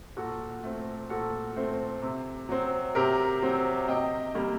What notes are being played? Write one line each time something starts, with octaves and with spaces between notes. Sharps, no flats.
A#2 F#4 A4
A3 C4
A#2 F#4 A4
A3 C4
C3
F#3 C4
C3 G4 A#4
F#3 C4
C3 D#5 G5
G3 A#3